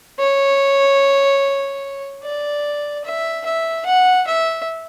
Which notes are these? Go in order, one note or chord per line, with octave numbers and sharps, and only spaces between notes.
C#5
D5
E5
E5
F#5
E5